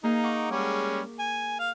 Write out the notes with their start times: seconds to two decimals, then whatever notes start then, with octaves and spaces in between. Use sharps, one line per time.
0.03 A#3 D#4 G#4 F5
0.23 F#5 C#6 D6
0.51 G3 G#3 C#4
1.19 G#5
1.59 F5